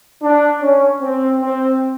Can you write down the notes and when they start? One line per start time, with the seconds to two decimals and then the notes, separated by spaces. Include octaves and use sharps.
0.22 D4
0.62 C#4
1.01 C4
1.41 C4